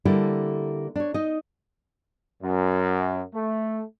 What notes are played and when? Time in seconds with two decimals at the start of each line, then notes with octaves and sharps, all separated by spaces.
0.05 D3 G3 A#3 E4 A4
0.96 D4 C#5
1.14 D#4 D#5
2.42 F#2
3.33 A3